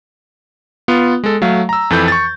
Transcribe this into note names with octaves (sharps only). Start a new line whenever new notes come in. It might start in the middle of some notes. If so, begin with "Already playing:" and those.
B3 F4
G#3 A4
F#3 A3 F5
A#5 E6
F2 E3 A4 B5 G6
C#6 A6